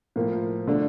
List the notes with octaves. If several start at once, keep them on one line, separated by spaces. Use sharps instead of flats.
A2 F3 A#3
D3 A3 D4